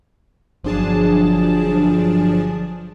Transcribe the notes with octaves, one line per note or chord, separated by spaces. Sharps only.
G1 F3 F#3 D4 G#4 A5